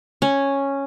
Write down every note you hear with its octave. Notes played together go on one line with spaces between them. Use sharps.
C#4